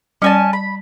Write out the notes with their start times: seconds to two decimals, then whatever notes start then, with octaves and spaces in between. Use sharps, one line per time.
0.22 G3 C#4 D5 G#5 A5
0.53 B5